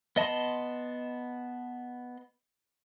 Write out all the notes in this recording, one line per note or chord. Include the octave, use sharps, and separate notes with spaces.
B3 D#5 A5 B5 C6